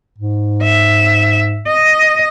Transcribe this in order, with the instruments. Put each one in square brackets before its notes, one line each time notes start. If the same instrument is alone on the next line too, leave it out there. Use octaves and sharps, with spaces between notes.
[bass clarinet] G#2
[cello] E5
D#5